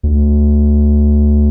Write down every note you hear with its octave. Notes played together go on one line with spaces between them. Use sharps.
D2